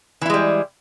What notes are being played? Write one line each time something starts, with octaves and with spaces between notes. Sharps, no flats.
E3 G3 G#3 E4